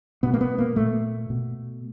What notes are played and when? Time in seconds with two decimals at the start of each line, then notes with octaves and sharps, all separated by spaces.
0.23 B2 B3
0.34 A#3
0.41 B3
0.58 A#3
0.76 A#2 A3
1.30 B2